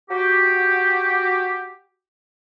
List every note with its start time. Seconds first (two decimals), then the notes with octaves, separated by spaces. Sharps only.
0.10 F#4 G4